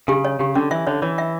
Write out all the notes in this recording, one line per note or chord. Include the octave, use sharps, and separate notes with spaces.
C#3 G4
C#5
C#3 G4
D3 C#4
E3 E5
D3 C#5
E3 C#5
E5